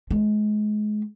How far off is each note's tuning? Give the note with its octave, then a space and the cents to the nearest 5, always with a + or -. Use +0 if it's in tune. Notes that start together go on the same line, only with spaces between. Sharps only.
G#3 +30